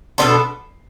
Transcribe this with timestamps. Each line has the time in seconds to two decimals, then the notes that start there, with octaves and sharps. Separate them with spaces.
0.18 B2 B3 D4 A4 C6
0.30 B5